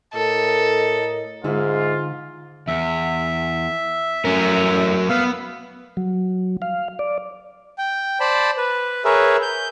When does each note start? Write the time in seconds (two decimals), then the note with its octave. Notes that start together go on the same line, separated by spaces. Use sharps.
0.14 A2 A4 A#4 D#5
1.44 G#2 D3 G#3 E4 F4
2.68 E2 E5
4.25 F#3 A3 C#4 A#4
5.09 B3 F5 E6
5.97 F#3
6.62 F5
6.99 D5
7.78 G5
8.20 C5 D5 A5 B5
8.58 B4
9.05 G#4 A#4 B4 C#5 E5
9.42 G6